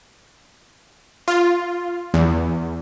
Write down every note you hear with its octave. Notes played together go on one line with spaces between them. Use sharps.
F4
E2